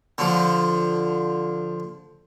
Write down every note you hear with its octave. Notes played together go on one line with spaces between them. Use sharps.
D3 F3